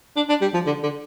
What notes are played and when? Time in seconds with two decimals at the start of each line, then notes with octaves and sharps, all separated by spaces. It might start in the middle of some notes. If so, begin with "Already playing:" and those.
0.16 D4
0.29 D4
0.41 G3
0.54 F3
0.66 D3
0.83 D3